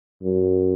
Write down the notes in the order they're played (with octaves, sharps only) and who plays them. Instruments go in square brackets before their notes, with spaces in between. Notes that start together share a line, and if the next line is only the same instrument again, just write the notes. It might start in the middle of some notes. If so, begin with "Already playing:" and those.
[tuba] F#2